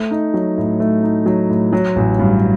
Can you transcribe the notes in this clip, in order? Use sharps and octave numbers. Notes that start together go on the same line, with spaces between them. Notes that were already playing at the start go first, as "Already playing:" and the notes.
Already playing: A3
D#4
F#3
A2
A3
D#4
F#3
A2
F#3
A1
G2